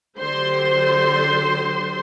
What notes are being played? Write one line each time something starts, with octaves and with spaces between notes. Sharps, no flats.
D3 F#3 G4 C5 C6